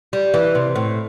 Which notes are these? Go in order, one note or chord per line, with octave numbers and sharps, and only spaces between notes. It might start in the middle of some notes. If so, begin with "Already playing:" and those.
G3
E3
C3
A2